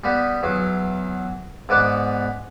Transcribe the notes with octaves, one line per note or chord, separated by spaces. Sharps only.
G3 B3
E2 F#3
G#2 B3 D5 F#5 D6